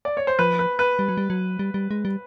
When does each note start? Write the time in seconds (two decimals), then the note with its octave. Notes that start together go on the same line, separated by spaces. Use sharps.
0.05 D5
0.17 C#5
0.27 C5
0.39 F3 B4
0.59 B4
0.79 B4
0.99 G3
1.08 F#3
1.17 G3
1.30 F#3
1.59 G3
1.74 G3
1.91 G#3
2.05 G3